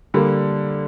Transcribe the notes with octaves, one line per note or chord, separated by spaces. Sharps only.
D3 G3 A#3